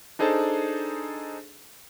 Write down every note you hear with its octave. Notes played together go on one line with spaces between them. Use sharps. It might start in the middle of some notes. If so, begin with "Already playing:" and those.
D4 D#4 G#4 A4 C5 A5